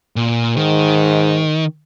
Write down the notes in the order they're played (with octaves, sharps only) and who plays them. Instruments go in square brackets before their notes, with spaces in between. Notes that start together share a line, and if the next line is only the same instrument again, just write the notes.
[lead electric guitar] A#2
[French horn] G#2 [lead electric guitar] D#3